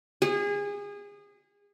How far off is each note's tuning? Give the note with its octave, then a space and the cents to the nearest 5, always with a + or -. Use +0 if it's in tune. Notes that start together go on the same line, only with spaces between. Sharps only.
G#4 -30